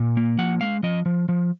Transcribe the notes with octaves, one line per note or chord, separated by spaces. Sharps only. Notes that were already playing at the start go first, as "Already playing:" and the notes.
Already playing: A#2
A#3
F3 F#5
G#3 F5
F3 D#5
F3
F3